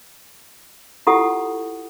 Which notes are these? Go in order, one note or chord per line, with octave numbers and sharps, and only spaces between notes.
E4 F4 G4 A4 F#5 D#6